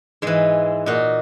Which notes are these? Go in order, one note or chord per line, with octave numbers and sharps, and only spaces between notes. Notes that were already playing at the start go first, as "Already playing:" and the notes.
G#2 E3 G#3
A#2 D#4 F#4